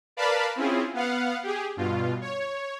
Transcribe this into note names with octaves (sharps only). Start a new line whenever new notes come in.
A#4 B4 D5 F5 A5 B5
C4 C#4 E4 F4 G#4
B3 F5 F#5
G4 G#4
G2 B2 F4
C#5